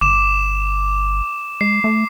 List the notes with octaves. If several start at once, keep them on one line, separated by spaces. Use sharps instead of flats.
G1 D6 E7
G#3 C7
A3